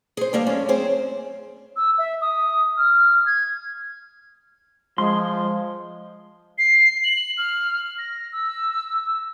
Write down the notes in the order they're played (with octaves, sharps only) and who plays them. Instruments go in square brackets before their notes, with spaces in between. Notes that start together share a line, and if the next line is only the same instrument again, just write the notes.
[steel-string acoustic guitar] G#4 C5
G3 A#3 D4 F5
F#2 A3 C#4
C4 G#4 C5
[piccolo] E6
E5
D#6
F6
G#6
[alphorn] F3 [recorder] G#3 [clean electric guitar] C6
[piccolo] C7
F#7
F6
A#6
E6